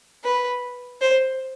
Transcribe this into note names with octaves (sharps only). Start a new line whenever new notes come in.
B4
C5